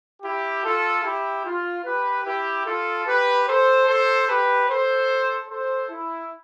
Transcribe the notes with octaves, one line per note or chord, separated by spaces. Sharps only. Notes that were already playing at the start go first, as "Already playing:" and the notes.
E4 G4
F4 A4
E4 G4
F4
G4 B4
E4 G4
F4 A4
G4 B4
A4 C5
A4 C5
G4 B4
A4 C5
A4 C5
E4